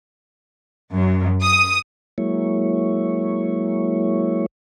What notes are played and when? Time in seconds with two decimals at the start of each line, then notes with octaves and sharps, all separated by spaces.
0.93 F#2
1.43 D#6
2.18 F#3 G#3 A#3 E4 C#5